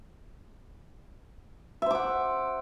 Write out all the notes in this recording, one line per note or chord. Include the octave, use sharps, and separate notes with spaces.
C5 E5 F#5 D6